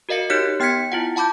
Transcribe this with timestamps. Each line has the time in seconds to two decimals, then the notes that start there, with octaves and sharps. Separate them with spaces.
0.09 F#4 A#4 D#5 F5 C#7
0.30 D#4 G4 C#5 F#6 G6 B6
0.60 B3 G5 F6 G#6 B6 C#7
0.92 E4 F4 F#5
1.16 F#5 A5 B5 D6 G6